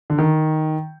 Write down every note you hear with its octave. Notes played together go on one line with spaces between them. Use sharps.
D3
D#3